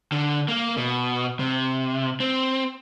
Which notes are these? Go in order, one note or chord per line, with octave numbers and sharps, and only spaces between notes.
D3
A#3
B2
C3
C4